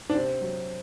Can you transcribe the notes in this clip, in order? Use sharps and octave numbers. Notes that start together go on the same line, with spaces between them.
D4
C3 C4
F#3